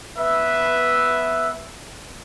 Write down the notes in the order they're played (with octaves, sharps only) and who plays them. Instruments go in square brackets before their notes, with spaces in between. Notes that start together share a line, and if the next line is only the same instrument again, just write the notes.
[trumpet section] B3 B4 E5